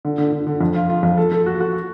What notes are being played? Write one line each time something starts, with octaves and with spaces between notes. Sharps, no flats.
D3
D3
D3
D3
F2
F4
F4
F2
A4
A4
F#4
F#4